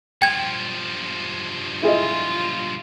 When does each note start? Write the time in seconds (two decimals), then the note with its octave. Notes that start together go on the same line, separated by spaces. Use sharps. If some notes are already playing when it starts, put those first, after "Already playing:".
0.22 G2 F3 G5 G#6
1.82 E4 F4 G#4 D#5